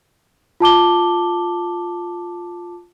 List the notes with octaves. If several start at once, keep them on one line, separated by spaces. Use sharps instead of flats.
F4 A5 D6 G7